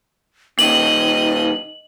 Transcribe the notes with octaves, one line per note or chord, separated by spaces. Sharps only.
A#2 D#3 D#4 D#5 F#7